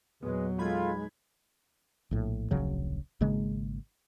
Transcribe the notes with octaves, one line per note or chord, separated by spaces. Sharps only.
E2 A#2 F#3 G#3 B3 B4
G#3 D#4 F4 A4 B5 G#6
A#1 A2
D1 A#1 C#3 F#3
G#1 C#3 G#3 A#3